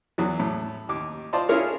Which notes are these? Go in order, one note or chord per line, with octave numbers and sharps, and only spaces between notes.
E2 E3 F#3
A2
D#2 D6
F4 C5 D5 D#5 A5 C6
C#4 E4 F4 G#4 A#4 C#5